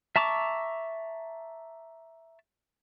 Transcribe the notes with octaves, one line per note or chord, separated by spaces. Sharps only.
E5 A5 A#5 C#6 D6